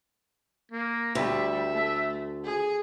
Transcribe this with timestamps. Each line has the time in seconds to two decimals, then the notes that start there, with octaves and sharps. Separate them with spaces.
0.72 A#3
1.15 D2 G3 E5
1.72 A3
2.44 G#4